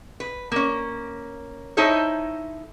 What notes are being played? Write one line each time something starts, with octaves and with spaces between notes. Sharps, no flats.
B4
A#3 C#4
D#4 E4 A4 C5 C#5